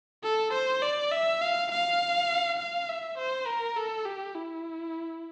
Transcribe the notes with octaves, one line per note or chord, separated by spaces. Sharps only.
A4
C5
D5
E5
F5
F5
F5
E5
C5
A#4
A4
G4
E4